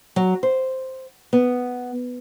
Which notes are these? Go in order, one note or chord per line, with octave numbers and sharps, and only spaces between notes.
F#3
C5
B3